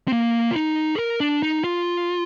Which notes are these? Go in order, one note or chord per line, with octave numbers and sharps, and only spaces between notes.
C4
A#3
F4
D#4
G#4
A#4
D4
D#4
F4